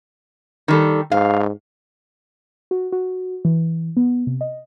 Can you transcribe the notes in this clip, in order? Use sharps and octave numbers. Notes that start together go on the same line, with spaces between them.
D#3 G3 A4
G#2 F5
F#4
F#4
E3
B3
C3
D#5